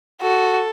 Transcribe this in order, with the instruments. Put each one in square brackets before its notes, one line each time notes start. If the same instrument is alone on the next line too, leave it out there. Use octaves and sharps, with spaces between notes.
[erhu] F#4 [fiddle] A4